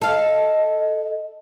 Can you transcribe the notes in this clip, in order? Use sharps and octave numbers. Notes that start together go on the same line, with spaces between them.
A4 D#5 F5